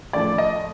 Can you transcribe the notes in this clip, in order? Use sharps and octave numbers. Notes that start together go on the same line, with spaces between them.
A2 F3 A3 D5
D#5